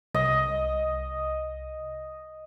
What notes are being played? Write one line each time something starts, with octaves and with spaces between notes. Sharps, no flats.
C2 D#5